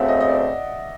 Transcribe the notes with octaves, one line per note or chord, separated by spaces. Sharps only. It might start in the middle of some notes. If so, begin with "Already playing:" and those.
Already playing: D2 C#3 F3 A3 C4 E5 F#5
D#5
D#5
D5